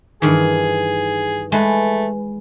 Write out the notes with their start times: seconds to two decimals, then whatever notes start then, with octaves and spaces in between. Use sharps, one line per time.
0.22 G2 D#3 E3 G#4
1.52 G#3 A3 B4